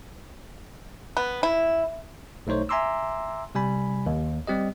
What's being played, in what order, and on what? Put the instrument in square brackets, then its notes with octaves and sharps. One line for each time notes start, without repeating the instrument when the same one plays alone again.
[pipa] B3
E4
[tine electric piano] B1 A3 D#4 C5 C#5
E5 G#5 A#5 C6 D6 E6
C3 G3 G#5 B5
D#2
G3 C4 G4 D#5